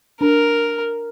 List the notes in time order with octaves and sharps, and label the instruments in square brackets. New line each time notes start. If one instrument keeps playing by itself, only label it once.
[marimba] D4 [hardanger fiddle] A#4